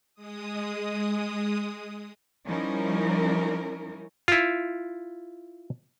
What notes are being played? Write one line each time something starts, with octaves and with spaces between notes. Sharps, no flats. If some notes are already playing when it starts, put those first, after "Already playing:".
G#3 D#6
F3 G3 C#4 D#4 E4 A#4
E4 F4